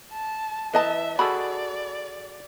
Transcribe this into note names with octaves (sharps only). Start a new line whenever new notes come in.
A5
E3 B4 D#5 E5 A5
F#4 G#4 A4 D5 B5